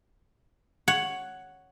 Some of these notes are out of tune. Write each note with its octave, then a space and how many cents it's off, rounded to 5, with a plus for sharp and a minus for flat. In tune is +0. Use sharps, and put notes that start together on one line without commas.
C#5 +0 F#5 +5